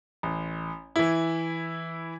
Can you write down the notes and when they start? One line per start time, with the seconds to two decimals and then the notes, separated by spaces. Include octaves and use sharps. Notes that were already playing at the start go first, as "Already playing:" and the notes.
0.23 A1
0.96 E3 E4